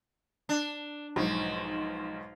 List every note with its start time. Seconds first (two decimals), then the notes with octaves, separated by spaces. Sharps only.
0.49 D4
1.16 B1 G#2 F3